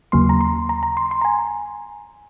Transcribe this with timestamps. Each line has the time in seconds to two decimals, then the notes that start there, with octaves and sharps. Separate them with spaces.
0.12 D#2 C#3 F#3 A#3 C6
0.29 A#5
0.41 C6
0.69 A#5
0.83 A#5
0.97 C6
1.11 C6
1.21 A#5
1.25 G#5